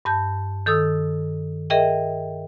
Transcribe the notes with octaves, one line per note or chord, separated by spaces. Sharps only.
G2 A5 G6
D#3 A4 D#6 E6
G#4 A#4 D#5 E5 G5